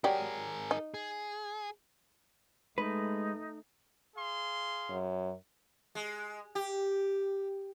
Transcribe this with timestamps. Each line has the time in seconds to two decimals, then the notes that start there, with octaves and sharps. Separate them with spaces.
0.04 F#3 G4 G#4 A#4 D5
0.71 D#4
0.94 G#4
2.78 G#3 A3 D#4 B4
4.16 G#4 F5 C6
4.90 F#2
5.95 G#3
6.55 G4